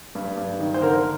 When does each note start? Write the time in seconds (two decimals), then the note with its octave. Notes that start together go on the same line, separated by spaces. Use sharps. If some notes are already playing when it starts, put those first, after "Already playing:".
0.15 G2
0.37 G2
0.59 D#3
0.74 C5
0.82 D3 A#4